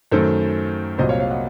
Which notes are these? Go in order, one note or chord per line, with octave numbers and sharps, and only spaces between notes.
F#2 D#3 A3 A4 C5
C2 A#2 F#3 C4 C5 D#5
C#5 F5
C#5 F5
D#5 F#5